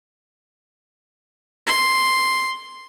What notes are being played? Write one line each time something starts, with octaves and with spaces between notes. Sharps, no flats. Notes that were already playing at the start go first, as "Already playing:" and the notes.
C6